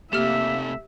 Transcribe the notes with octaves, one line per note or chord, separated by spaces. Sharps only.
C3 A3 A#3 G4 E5 F6